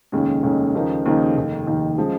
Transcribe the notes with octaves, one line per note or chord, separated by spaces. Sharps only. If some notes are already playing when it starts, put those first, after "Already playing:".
F1 D#2 C#3 G#3 C#4
F1 D#2 C#3 G#3 C#4
D#2 C#3 F3 A#3 D#4
D#2 C#3 F3 A#3 D#4
F1 D#2 D#3
F1 D#2 D#3
C#3 F3 G#3